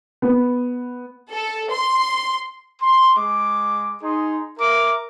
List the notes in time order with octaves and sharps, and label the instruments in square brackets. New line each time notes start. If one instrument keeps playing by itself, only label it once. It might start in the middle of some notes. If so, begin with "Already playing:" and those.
[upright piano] B3
[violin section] A4
C6
[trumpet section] C6
G#3 D6
D#4 G#4 C6
A#4 E5 D6